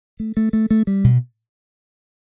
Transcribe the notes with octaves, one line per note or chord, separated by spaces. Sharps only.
A3
A3
A3
A3
G3
B2